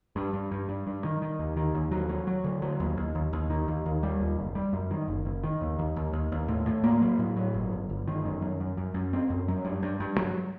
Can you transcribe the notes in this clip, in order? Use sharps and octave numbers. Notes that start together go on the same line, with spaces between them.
G2
G2
G2
G2
G2
D#3
D#3
D#2
D#3
D#2
F#3
F#3
F#3
D3
F#3
D#2
D#2
D#2
D#2
D#3
D#2
D#2
G3
D#2
F#1
G3
F#2
D#3
F#1
F#1
D#3
D#2
D#2
D#2
D#2
D#2
A2
A2
A#3
F#3
A2
F#3
G1
G1
G1
D#3
F#2
F#2
F#2
F#2
F#2
C4
F#2
F#3
G2
G2
G2
F#3